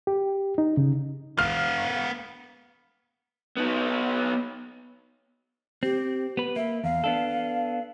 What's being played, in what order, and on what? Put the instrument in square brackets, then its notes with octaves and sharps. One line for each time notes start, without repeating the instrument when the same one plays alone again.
[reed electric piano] G4
D#4
C#3
[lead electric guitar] B3 F5 [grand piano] F6
[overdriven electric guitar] B3 D#4
[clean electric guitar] C4 [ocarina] G4
[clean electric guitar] B3 B4
[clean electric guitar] A#3 [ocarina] E5
[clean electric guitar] E2 [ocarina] F5
[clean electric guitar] B3 D4 A4